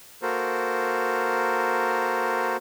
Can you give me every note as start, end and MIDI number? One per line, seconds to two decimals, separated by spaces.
0.22 2.57 58
0.22 2.57 66
0.22 2.57 69
0.22 2.57 70
0.22 2.57 72